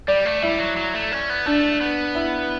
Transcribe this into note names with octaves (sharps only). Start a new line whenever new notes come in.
G3 D5
A3
G3 E4
F#3
F#3
A3
C#4
B3
A3 D4
B3
E4